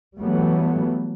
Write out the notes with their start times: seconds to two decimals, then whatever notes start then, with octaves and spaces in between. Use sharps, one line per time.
0.21 E3 F#3 G3 A3 B3